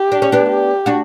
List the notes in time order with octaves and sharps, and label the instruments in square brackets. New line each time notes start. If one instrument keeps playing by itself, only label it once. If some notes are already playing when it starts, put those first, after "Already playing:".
Already playing: [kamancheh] G4
[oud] D4
C#4
B3 D4
[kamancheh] G4
[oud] D4 F#4